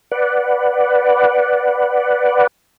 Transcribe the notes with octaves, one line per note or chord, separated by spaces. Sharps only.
B4 D5 F#5